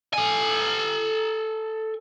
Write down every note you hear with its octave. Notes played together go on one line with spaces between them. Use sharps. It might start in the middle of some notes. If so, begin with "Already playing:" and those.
A4 G#5